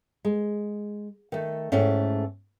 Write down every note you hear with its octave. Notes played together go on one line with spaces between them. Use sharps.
G#3
D#3 A3
G#2 A3 C#4 E4 G5